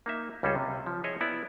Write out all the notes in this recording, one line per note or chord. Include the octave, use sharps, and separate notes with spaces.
A#3 D#4 E5
C#2 G3 C#4 G#4 A4
C3
F3
E4 G#4 C#5 D#5 E5
B3 E4 D5